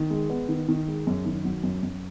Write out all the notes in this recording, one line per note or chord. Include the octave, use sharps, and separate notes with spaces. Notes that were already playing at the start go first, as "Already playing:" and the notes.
Already playing: D#3
G#3
B3
D#3
D#3
G#3
F#2
D#3
F#3
F#2
F#2